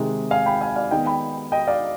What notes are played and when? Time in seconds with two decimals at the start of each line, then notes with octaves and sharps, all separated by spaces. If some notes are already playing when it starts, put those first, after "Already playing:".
Already playing: C3 D#3 G#3
0.31 F5 G#5
0.46 G5 B5
0.61 F5 G#5
0.76 D5 F5
0.91 D#3 G#3 B3 D#5 G5
1.06 G5 B5
1.52 D#5 G5
1.67 D5 F5